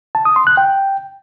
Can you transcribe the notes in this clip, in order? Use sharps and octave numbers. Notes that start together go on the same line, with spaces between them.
A5
D#6
C6
F#6
G5